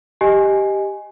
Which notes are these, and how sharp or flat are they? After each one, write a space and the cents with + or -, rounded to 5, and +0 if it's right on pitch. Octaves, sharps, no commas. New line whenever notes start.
G4 +0 D#5 +0 G#5 +0